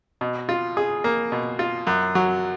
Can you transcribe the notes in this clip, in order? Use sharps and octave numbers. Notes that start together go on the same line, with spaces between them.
B2
F4
G#4
A#3
B2
F4
F#2
F#3